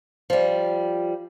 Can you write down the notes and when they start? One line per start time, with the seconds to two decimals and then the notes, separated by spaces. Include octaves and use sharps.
0.30 F3 G3